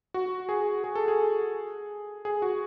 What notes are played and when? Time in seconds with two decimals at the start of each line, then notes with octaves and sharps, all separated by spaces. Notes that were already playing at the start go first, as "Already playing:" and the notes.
0.14 F#4
0.49 G#4
0.84 G#4
0.95 A4
1.08 G#4
2.25 G#4
2.42 F#4